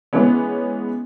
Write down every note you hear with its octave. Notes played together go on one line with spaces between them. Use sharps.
E3 G#3 B3 C#4